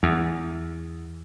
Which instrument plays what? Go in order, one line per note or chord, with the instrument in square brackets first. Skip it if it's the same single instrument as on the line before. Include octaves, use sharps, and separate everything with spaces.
[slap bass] E2